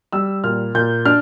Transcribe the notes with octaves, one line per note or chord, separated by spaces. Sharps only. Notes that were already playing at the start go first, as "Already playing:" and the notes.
G3 E6
A#2 F6
A#2 G6
D4 F6